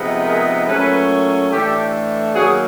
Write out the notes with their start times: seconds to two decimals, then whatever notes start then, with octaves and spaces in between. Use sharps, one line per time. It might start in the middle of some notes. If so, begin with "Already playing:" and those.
Already playing: C3 F3 G#3 B3 D#4
0.24 G#4 A#4
0.67 A#2 F#3 A3 C#4 A4 B4
1.50 A2 E3 A3 D4 G4 A4
2.34 D#3 F#3 A#3 F#4 G#4